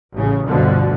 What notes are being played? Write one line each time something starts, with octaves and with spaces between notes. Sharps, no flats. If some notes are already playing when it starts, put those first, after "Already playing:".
A1 C#3
D2 G2 B2 D3 F3